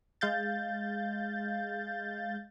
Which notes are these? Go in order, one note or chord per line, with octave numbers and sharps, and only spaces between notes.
G#3 F5 G6 A6